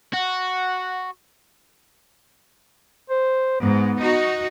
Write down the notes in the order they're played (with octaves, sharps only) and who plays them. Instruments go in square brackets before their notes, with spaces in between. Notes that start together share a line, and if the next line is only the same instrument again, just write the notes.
[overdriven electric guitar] F#4 [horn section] F#5
[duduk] C5
[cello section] G#2 [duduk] B3
[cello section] D#4 F#4